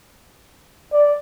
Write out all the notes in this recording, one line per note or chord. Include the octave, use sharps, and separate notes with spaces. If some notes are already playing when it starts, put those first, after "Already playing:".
D5